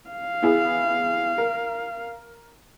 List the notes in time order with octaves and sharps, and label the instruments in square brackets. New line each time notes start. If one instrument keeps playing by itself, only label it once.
[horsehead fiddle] F5
[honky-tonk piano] B3 E4 G#4
A#4